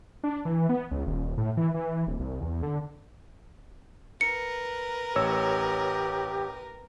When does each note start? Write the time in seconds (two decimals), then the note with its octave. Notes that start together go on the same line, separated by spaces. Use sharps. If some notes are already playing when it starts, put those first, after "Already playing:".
0.24 D4
0.45 E3
0.69 B3
0.91 C#2
1.06 D#1
1.38 A2
1.57 E3
1.74 E3
2.07 D1
2.20 C2
2.41 E2
2.63 D3
4.21 A#4 B4 C#7
5.16 A1 G4 C#5 E6